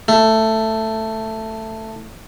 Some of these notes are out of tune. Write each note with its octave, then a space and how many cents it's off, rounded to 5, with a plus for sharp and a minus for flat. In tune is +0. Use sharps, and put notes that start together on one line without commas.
A3 +10